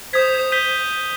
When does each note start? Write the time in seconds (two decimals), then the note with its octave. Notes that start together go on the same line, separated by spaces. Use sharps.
0.13 C5 D#6 G#6 B6
0.52 G6 B6 D#7 G7